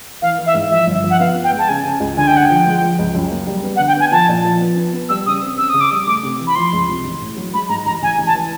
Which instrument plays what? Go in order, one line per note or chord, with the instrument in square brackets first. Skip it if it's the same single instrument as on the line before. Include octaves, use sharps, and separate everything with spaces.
[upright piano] E3 [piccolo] F5
[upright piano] E3
[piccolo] E5
[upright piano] G#2
[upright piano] F3 [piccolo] E5
[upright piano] G1
F3
[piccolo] F#5
[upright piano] B3 [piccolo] F5
[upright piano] B3
[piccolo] G5
[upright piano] G#3
[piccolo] A5
[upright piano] C#3 [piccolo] G#5
[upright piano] C#3
C#2
[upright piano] D3 [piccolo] G#5
[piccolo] G5
[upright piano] D3 [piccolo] F#5
[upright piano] F3 [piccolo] G5
[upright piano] G#3
F3
C#2
F#2
A#3
G3
B3
[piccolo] F#5
[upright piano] D3
[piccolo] G5
[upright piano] B3 [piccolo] G#5
[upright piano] F3 [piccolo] A5
[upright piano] A#2
F3
B3
B3
B3
[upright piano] G3 [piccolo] E6
[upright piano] C#3 [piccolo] D#6
[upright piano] C4
[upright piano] C#3 [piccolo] E6
[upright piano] C#3 [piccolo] D#6
[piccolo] D6
[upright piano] G3 [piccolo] D#6
[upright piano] A3 [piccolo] D6
[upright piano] C3
E3
[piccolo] B5
[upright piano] F3 [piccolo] C6
[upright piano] C#2
C3
A1
A2
F#3
[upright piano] G#3 [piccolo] B5
[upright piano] G#2 [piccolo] A#5
[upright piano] A1 [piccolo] A#5
[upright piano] A1 [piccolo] G#5
[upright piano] A1
[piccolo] A5
[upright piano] E3